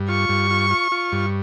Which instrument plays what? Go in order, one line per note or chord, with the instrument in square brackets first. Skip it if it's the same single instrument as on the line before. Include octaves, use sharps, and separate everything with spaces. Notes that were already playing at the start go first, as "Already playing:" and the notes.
Already playing: [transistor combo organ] G2
[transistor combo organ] F4 [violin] C#6
[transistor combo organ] G2
F4
F4
F4
G2